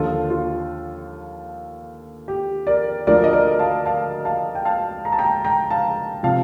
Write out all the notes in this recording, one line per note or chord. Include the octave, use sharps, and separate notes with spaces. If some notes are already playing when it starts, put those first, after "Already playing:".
Already playing: D#2 D3 F3 F4 A4
F4
G4
A#4 D5
D2 D3 F3 A#4 D5
D#5
A#4 D5
F5 A5
F5 A5
F5 A5
G5
F5 A5
A#5
A5
G5 A#5
G5 A#5
F5 A5
C3 F3 F5 A5